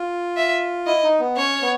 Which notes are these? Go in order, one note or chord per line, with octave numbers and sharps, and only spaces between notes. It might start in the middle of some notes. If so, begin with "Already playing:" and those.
Already playing: F4
E5
E4 D#5
D#4
B3
C#4 C#5
B3